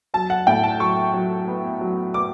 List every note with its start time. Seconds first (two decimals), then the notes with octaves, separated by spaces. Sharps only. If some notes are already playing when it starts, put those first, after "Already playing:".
0.14 F#3 A5
0.30 F#5
0.47 A2 G5
0.63 A5
0.80 F#3 C#6
1.14 F#3
1.48 B3
1.81 F#3
2.14 B3 D6